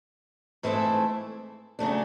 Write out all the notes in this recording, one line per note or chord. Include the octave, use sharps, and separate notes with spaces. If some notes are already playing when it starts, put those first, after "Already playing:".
G#2 E3 A3 C4 E4
C#3 F#3 A3 D4